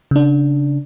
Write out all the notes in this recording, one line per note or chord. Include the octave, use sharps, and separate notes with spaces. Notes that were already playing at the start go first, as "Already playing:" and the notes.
C#3 D4